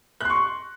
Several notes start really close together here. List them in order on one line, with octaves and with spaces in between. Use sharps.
F#6 C6 C#6